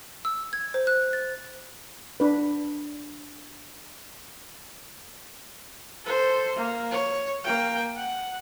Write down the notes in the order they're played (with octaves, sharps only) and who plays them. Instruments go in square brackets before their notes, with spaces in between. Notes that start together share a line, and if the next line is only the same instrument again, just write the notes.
[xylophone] E6
G#6
C5
F#6
A6
[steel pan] D4 B4
[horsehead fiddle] A4 C5
A#3
C#5
A#3 G5
F#5